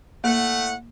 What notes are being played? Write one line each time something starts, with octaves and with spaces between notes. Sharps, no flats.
A2 A3 A#3 F#5